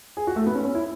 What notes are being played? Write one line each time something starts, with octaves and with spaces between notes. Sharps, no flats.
G#4
F#4
A3
B3
C#4
C#4
E4